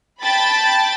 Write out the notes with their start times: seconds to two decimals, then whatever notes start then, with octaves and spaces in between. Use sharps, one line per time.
0.23 G5 A5 B5 A6